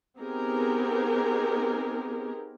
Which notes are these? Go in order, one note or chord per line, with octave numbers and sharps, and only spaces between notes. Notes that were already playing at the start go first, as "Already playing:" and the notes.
B3 C4 D#4 G4 G#4 A#4